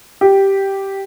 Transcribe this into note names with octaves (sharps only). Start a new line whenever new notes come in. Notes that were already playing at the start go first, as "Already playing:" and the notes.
G4